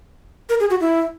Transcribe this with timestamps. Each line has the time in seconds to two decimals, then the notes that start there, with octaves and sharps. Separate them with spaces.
0.49 A#4
0.60 G#4
0.70 F#4
0.81 E4